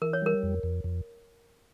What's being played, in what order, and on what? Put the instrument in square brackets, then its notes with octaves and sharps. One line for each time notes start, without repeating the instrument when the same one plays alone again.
[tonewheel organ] E3 [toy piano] A#4
[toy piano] C#5
[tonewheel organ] G3 [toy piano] A#4
[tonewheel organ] F2
F2
F2